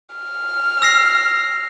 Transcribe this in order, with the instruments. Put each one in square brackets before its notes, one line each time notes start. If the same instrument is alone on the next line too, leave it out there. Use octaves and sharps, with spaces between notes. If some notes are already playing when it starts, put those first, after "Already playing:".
[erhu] F6
[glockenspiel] E6 A#6 C7